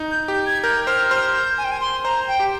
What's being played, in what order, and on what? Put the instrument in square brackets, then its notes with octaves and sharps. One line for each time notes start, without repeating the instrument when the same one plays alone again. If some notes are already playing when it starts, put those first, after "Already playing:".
Already playing: [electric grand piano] D#4
[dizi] G6
[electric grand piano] G4 [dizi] G6
[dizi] G#6
[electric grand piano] A#4 [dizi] G6
[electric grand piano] C5 [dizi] F6
[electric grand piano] C5 [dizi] F6
[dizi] G6
G#5
G5
G#5
C6
[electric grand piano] C5 [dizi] A#5
[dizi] G5
[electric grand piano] G4